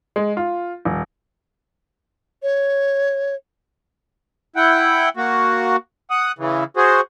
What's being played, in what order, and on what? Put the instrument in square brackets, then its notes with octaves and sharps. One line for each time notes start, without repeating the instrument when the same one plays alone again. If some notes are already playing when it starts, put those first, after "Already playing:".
[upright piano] G#3
F4
D#1
[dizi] C#5
[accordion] E4 F#5 G5
A#3 F#4
F#5 D#6
C#3 E3
F#4 G#4 C5